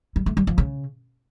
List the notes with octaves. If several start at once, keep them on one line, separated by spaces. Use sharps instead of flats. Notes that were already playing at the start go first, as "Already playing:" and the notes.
G3
A3
G3
F3
C#3